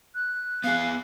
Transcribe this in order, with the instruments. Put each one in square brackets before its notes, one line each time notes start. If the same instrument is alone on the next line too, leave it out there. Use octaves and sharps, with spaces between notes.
[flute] F#6
[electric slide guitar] B3 G#4 [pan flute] F5